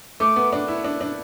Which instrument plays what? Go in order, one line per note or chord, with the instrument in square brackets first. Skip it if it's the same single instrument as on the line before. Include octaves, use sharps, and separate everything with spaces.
[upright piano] A3 [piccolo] D6
[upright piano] B3
D4
E4
D4
D4